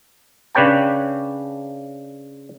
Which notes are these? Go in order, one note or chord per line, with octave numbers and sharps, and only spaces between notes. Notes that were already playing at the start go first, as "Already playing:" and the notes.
C#3 D4 B4 C#5 G5 A5